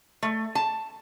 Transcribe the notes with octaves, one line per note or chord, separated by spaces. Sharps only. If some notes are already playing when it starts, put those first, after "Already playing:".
A3
A5